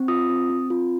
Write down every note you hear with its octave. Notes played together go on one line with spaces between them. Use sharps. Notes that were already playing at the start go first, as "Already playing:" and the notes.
Already playing: C4
F4 D#6
C4
C4
F4